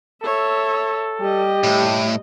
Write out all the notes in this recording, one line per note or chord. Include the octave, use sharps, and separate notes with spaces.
A4 C#5 E5
G3 G4 D#5
A2